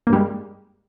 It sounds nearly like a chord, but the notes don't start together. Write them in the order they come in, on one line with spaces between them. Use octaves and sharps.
A#3 G2 G3 G#3